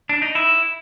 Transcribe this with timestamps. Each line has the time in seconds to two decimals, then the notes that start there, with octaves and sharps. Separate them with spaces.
0.09 D4
0.22 D#4
0.35 E4